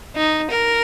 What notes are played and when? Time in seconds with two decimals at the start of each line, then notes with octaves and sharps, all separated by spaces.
0.16 D#4
0.50 A#4